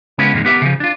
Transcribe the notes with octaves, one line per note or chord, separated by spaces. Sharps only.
C#3 G#3 B3 C#4 E4
F2 A#2 D#3 G#3
B3 G4 A#4 E5
C#3 F3
D4 F4